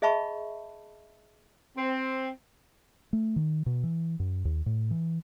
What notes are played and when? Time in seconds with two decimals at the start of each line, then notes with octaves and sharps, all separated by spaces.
0.02 G#4 D#5 E5 A5 B5 C#6
1.77 C4
3.13 A3
3.36 D#3
3.66 B2
3.83 E3
4.20 F#2
4.45 D#2
4.66 A2
4.91 E3